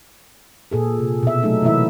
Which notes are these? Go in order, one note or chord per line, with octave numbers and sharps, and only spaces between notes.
A#2 G#4 A4
C3
B2 E5
F#3 A3 D#4 A4
C3 E3 A#3 E4 E5